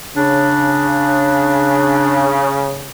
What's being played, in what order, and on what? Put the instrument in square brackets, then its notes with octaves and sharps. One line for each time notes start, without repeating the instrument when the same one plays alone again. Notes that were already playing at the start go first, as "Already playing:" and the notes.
[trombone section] C#3 [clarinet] D4